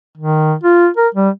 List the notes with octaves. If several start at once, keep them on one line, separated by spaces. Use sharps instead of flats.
D#3
F4
A#4
G3